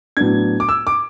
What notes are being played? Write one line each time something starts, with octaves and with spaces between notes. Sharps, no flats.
A2 F#3 B3 D4 G#6
D6
E6
D6